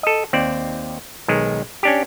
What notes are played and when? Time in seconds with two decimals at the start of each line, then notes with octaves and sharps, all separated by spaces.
0.03 A4 D#5
0.33 D#2 C4 D5
1.28 B1 D#3 G#3
1.83 C#4 D4 G4